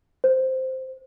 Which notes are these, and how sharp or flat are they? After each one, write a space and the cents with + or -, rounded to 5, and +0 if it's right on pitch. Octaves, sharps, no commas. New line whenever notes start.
C5 -5